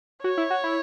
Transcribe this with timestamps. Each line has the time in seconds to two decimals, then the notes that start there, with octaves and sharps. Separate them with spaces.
0.23 F#4 C#5
0.38 E4
0.50 F#4
0.64 E4